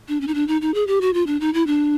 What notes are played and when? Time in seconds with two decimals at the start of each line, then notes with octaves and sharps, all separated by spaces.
0.08 D4
0.21 C#4
0.27 D#4
0.35 D4
0.48 D#4
0.61 D#4
0.74 G#4
0.87 G4
1.01 F#4
1.14 F4
1.27 D4
1.40 D#4
1.54 E4
1.67 D4